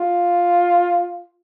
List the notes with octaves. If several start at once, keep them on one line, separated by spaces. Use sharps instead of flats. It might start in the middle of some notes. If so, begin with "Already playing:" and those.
Already playing: F4